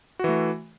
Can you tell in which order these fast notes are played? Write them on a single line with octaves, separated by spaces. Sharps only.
F#4 E3 A3